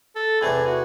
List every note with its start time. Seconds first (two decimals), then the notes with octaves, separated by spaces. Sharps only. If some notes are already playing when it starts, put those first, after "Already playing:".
0.16 A4
0.41 E2 C3 E3 A3 C4 G#4
0.67 F#4